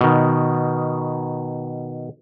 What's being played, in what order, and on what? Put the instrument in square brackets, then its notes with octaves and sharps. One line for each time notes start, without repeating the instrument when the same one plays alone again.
[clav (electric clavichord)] B2 D#3